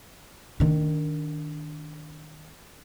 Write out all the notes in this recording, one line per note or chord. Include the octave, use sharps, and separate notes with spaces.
D#3 D4